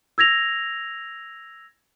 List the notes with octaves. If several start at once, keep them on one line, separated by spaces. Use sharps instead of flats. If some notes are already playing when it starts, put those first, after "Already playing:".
E6 G#6 A#6 F7